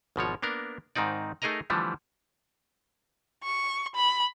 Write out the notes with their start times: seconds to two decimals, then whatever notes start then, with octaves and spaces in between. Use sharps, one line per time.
0.16 G#1 B2 F3 C#5
0.42 A#3 B3 D4 A#4
0.95 G#2 D#3 C4 D#4 D5
1.42 A3 D#4 G#4 A#4 D#5 A#5
1.70 D3 E3 F3 G3 A3
3.44 C#6
3.95 B5